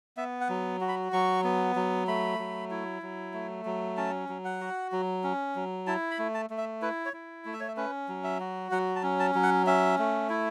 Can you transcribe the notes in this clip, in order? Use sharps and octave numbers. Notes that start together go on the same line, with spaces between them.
B3 E5
F#5
F#3
F#4
B5
F#3 C#6
B3
F#3
A3 B5
F#3
E4
F#3
A3
F#3
C#4 A5
F#3
F#5
F#4
F#3
C#4
F#3
E4 A5
B5
A3
A5
A3
E5
E4 B4
C#5
E4
A3
E5
C#5
E5
C#4 B4
F#3
E5
F#4
F#3 F#5
A5
C#4
A5
F#3
F#5
C#4 E5
A3
E4